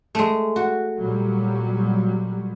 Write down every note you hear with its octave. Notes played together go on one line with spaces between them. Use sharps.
G#3 A3
F#4
A#2 F#3 G3